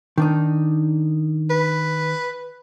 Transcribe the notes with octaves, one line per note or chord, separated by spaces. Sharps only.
D#3 D4 D#4
B4